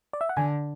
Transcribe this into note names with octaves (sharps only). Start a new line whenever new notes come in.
D5
E5
F#5
D3 G#5